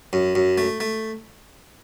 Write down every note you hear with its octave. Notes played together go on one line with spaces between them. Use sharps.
F#2
F#2
A3
A3